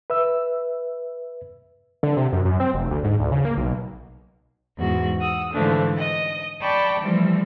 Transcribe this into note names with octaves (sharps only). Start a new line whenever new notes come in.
B4 E5 E6
D3
C3
F#2
F#2
C4
F1
D2
G#2
D2
C#3
A#3
B1
E2 G#2 F#4
F#5 D#6 E6
G#2 D3 E3 F3 A3 D4
D#5 D#6
D5 G5 A5 B5 C#6 D6
E3 F3 G3 A3